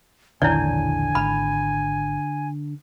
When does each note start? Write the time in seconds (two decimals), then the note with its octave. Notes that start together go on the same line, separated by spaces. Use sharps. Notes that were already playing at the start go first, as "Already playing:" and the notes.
0.42 E1 A#1 D3 D#3 E4 C#5 D5 G#5
1.15 G#1 B5